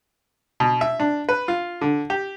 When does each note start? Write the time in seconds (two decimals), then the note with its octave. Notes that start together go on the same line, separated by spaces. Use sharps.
0.60 B2
0.81 E5
1.00 D4
1.29 B4
1.48 F4
1.81 D3
2.10 G4